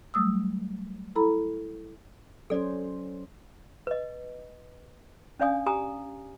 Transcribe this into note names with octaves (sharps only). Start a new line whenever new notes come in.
F#3 G3 A3 D#6 E6
E4 A4 A#5 B5
F#3 C#4 A4 C5 D5
B4 D#5
C#4 D4 D5 F5 G#5 D#6
G4 G#5 A#5 D#6